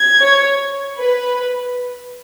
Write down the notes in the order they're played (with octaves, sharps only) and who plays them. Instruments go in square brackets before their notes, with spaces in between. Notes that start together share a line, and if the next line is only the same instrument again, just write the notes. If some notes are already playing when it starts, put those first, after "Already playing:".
Already playing: [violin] G#6
[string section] C#5
B4